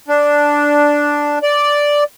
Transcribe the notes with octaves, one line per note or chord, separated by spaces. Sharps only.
D4
D5